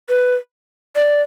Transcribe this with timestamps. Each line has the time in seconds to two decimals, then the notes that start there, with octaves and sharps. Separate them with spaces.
0.09 B4
0.96 D5